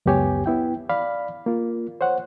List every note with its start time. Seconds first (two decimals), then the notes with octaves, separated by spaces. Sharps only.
0.06 C#2 F#2 B3 G4 C#5 G#5
0.46 B3 E4 G5
0.90 D5 F5 B5
1.46 A#3 F4
2.01 C5 C#5 F#5